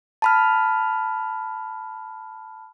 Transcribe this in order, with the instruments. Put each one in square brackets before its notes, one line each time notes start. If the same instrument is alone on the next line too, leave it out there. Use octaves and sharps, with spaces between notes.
[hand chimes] A5 B5 F6